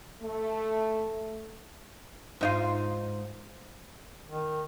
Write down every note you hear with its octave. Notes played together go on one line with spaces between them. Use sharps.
A3
G#2 D#4 F4
D#3